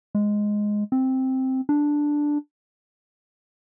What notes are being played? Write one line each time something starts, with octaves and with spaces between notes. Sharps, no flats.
G#3
C4
D4